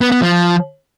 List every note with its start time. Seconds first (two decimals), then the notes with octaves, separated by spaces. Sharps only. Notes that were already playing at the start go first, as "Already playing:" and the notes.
0.01 B3
0.12 B3
0.22 F3